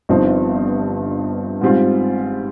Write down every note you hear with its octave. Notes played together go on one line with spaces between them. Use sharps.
G1 G2 F3 C4 D#4
G#2 G3 C4 F4